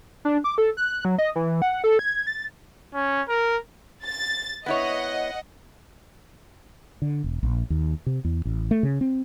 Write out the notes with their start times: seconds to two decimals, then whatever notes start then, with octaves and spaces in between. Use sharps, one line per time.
0.25 D4
0.44 D6
0.58 A4
0.77 F#6
1.05 F#3
1.18 D#5
1.36 E3
1.62 F#5
1.84 A4
1.99 G#6
2.27 A6
2.95 C#4
3.29 A#4
4.04 A6
4.66 B3 E4 C#5 D#5 F#5
7.02 D3
7.24 E1
7.43 A#1
7.70 D#2
8.06 C3
8.24 E2
8.45 A1
8.71 A3
8.83 C#3
9.01 C4